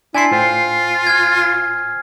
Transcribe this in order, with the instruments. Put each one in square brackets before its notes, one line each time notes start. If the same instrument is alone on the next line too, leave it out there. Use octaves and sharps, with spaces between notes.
[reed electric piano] D4 A5 C6 [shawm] E4 [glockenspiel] G#5 C7
[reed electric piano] A2 C5 G5 [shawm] F4
[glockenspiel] F6 G#6